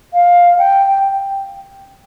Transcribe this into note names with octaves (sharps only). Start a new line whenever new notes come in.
F5
G5